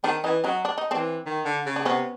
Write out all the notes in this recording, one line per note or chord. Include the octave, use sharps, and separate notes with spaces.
D#3 C4 D4
E3 C#4 D#4
F#3 C#4 D#4
D4
D#4
E3 C4 D4
D#3
D3
C#3
D4
C3 B3 C#4